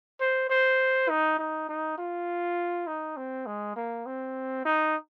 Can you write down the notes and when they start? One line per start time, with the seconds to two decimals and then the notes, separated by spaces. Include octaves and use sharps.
0.21 C5
0.50 C5
1.09 D#4
1.39 D#4
1.69 D#4
1.98 F4
2.87 D#4
3.17 C4
3.47 G#3
3.76 A#3
4.06 C4
4.65 D#4